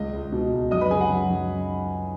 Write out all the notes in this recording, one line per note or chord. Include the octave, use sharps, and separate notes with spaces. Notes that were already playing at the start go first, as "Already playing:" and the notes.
Already playing: C#2 D#5
C#2
B2
C#2
F#2 D#5 D#6
B4 B5
C#3 G#4 G#5
F#4 F#5
F#2
F#2